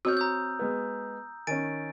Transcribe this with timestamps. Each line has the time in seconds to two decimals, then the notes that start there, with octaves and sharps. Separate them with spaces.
0.05 C4 F#4 C#5 E6 F6 G6
0.17 A#5 D#6 G6
0.59 G#3 B3
1.47 D#3 C#4 G#5 A6 D7